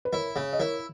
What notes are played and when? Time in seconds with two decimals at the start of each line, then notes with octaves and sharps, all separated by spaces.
0.05 B4
0.12 E4 A#4 C#5
0.36 C#3
0.53 D#5
0.59 E4 A#4 C#5